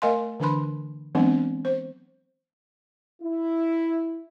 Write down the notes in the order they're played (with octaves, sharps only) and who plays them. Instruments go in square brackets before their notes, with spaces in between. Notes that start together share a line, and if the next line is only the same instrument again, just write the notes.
[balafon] A3 A#4 D#5 F5 G#5 C6
D3 E3 D4 B4 B5 C6
E3 F#3 G#3 B3 C4 D4
C5
[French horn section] E4